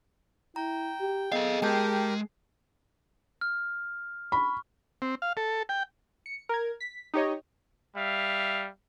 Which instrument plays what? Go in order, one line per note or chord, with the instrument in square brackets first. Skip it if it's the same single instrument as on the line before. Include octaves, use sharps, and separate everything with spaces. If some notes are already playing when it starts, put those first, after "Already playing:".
[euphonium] E4 [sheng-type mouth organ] G5 [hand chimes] A#5
[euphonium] G4
[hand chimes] B3 D#5 [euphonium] G#4 [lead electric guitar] A4 F5
[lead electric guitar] G#3 [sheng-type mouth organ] G4 A#4 [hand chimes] G5 A5 G6
[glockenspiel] F6
[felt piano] B5 [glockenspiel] C#6
[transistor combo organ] C4
F5
A4
G5
[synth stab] C#7
A#4 G#6
B6
D#4 G4 C#5 D#5
[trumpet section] G3 E5 F5